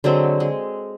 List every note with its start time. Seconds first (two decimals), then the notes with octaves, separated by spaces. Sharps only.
0.04 D3 F#3 G#3 C4
0.40 G#3